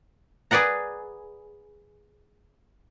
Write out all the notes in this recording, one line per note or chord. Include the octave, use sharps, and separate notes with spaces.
G#4 B4 D5 F#5 A#5